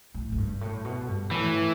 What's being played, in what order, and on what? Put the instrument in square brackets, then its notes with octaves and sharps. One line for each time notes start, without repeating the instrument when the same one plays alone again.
[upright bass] A2
A2
G2
A2
B2
G2
[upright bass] A2 [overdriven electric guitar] E3